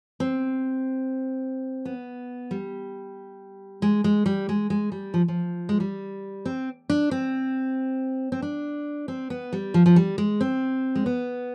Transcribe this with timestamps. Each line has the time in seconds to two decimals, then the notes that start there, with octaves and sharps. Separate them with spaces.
0.20 C4
1.85 B3
2.51 G3
3.82 G#3
4.04 G#3
4.26 G3
4.49 G#3
4.70 G#3
4.92 G3
5.14 F3
5.28 F3
5.69 G#3
5.80 G3
6.45 C4
6.90 D4
7.11 C4
8.32 C4
8.42 D4
9.08 C4
9.30 B3
9.53 G3
9.74 F3
9.86 F3
9.96 G3
10.18 G#3
10.41 C4
10.95 G#3
11.06 B3